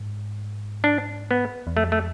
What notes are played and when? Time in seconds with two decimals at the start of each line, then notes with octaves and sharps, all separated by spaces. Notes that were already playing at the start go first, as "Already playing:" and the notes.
Already playing: G#2
0.84 D4
1.31 B3
1.67 E2
1.75 F2 A3
1.92 A3